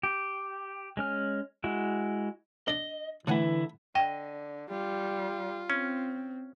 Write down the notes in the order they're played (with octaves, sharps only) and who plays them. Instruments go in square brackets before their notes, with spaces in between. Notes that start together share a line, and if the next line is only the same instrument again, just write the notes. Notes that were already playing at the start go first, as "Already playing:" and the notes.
[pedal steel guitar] G4
G#3 C#4 F6
G#3 E4 F#4
[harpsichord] D4 D5 [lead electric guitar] D#5
[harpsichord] A2 F#5 G#5 [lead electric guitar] D3 E4 [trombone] E3
[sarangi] D3 [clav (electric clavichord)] D#5 [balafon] G5
[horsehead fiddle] G3 [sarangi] F4
[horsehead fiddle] C4 [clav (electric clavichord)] C#4